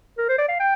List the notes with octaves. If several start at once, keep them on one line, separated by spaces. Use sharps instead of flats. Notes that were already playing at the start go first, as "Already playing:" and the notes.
A#4
C5
D5
F5
G5